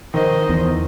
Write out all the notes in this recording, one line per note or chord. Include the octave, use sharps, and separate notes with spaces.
D#3 C5 D#5
E2